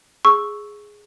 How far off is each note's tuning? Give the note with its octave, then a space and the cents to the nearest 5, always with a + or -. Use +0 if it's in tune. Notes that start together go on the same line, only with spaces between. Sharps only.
G#4 +0 C#6 +0 E6 +0